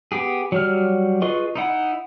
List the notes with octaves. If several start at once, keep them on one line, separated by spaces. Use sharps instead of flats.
B3 G4 G#4
F#3 G3 F6
F4 G#4 B4 D#5 C#6
D#4 E4 F#5